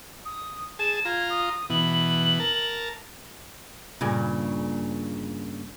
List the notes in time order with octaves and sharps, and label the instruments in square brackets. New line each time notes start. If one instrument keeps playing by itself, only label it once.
[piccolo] D#6
[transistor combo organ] G#4 A5 [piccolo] E7
[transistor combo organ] F4 A#5 [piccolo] G#6
[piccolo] D#6
[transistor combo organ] B2 E3 [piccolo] F#7
[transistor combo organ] A#4 A5
[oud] G2 A#2 C#3